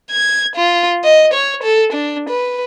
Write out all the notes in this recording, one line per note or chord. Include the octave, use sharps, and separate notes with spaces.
G#6
F4
D#5
C#5
A4
D4
B4